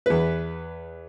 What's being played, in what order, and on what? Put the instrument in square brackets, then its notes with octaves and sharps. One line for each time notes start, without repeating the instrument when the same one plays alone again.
[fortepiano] E2 B4